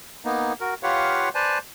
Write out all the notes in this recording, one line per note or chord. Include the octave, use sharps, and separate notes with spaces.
A#3 B3 D#4
F#4 A#4
F4 G4 B4 C#5 F5 F#5
B4 C5 D5 G#5 A5